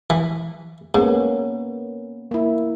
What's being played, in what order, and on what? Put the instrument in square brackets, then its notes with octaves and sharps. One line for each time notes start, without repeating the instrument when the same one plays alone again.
[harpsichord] E3
[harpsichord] G#2 [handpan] A#3 B3 C#4
[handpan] A#3 E4